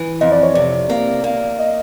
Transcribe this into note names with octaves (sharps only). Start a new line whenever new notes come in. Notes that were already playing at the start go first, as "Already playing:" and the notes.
Already playing: E3
F2 D#5
D5
C#5
C3 D5
A#3
A#3
D#5